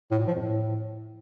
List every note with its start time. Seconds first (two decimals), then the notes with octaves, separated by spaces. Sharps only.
0.11 A2
0.19 A#2
0.27 F3
0.34 F2
0.42 A2